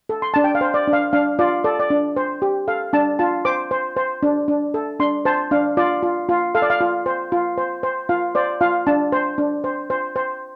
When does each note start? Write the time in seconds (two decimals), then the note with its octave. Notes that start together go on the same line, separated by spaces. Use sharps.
0.09 A4
0.22 C6
0.34 D4 A5
0.44 G5
0.55 F5
0.61 C5
0.74 D5
0.87 D4
0.93 F5
1.13 D4 F5
1.39 F4 D5
1.64 A4 D5
1.80 D5
1.90 D4
2.16 C5
2.42 G4
2.68 A4 F5
2.93 D4 A5
3.19 F4 A5
3.45 C5 D6
3.71 C5
3.96 C5
4.23 D4
4.48 D4
4.74 A4
5.00 D4 C6
5.25 C5 A5
5.51 D4 F5
5.77 F4 D5
6.03 F4
6.29 F4
6.55 A4 F5
6.62 D5
6.70 F5
6.81 F4
7.06 C5
7.32 F4
7.58 C5
7.83 C5
8.09 F4 F5
8.35 C5 D5
8.61 F4 F5
8.87 D4 A5
9.12 C5
9.38 D4
9.64 C5
9.90 C5
10.16 C5